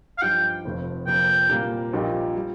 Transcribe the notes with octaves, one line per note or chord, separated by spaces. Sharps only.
F5
G2 F3 D#4 G4 G5
F1 F2 F3
F1 F2 F3 A#3 G5
A#2 G3 A#3
A#1 A#2 G3 D#4 G4
G3